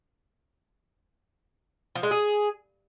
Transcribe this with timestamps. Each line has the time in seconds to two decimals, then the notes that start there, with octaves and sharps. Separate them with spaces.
1.95 F3
2.03 G#3
2.11 G#4